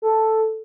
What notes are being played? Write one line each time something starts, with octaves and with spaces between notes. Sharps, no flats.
A4